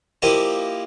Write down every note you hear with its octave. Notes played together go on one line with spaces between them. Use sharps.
F3 A#3 E4 G4 D#5